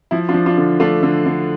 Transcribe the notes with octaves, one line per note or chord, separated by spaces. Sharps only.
F3 E4
D4 F4
F3
D4 F4
D3
A3 D4 F4
D3
D3